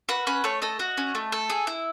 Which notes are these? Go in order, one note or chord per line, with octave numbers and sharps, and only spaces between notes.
F#4 B4
C#4 B4
A3 C#5
A4 D#5
F#4
C#4
A3
A4
G#4
E4